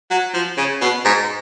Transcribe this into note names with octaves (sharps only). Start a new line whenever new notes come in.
F#3
F3
C#3
B2
G#2